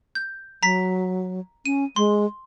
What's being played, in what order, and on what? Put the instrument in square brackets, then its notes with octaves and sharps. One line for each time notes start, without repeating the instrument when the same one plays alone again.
[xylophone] G6
[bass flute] F#3 [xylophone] A#5 B6
[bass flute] C#4 [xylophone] D#7
[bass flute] G#3 [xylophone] C6